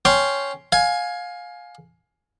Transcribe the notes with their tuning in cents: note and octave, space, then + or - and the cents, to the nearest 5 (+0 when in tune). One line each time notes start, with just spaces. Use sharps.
C#4 +5 G5 +0 C6 +0
F5 +20 G#5 +10